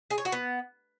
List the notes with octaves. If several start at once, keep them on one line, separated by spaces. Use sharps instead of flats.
G#4
C#5
F#4
B3